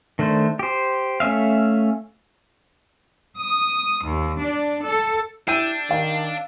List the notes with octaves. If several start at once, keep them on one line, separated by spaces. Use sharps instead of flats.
D#3 A3 D4 C5
G4 C5
A3 C#4 E5 F5
D#6
D#2
D4
A4
D4 E4 G5 E6 G6 D#7
D#3 F5